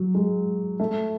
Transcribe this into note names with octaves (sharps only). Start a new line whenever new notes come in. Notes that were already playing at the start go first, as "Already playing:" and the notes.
Already playing: F#3
G#3
A3